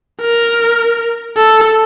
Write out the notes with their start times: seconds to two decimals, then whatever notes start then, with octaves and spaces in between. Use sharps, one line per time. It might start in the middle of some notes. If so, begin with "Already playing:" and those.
0.21 A#4
1.37 A4